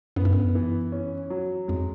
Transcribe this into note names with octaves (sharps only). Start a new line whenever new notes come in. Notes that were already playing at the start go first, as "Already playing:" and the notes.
F#2 B3
G2
F#2
E3
C#4
F#3
F2 G#3